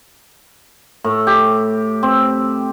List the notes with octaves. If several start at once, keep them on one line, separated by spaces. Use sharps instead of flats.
A2
G4
C4